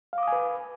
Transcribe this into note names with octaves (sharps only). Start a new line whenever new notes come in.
B4 F5 G#5 D6 D#6